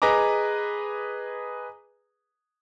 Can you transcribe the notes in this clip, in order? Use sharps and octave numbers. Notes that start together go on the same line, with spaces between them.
G#4 B4 D#5 G#5 A#5 D6